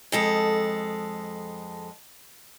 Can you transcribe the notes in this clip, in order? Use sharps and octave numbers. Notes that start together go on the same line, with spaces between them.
F2 G#3 A4